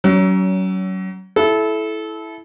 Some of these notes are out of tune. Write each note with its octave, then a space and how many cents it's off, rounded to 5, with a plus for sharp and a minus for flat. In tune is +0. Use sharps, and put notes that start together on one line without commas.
F#3 +30 C#4 +25
E4 +0 A4 -25